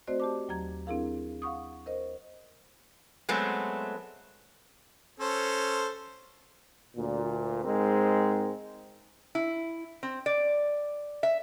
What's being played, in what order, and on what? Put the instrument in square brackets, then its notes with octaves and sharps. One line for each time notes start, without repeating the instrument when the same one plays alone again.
[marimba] A3 C4 F#4 C5 D5 D#5
G4 A5 D6
D#2 F#3 A#5 G#6
C4 D4 E4 G#4 A#4 F5
F5 F#5 C#6 D#6
A#4 C5 D#5
[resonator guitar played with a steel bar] F#3 G#3 A3 B3 C4
[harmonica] C#4 A4 C5
[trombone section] D2 A#2
G#2 G#3 C4 A#4
[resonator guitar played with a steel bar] E4
C4
D5
E5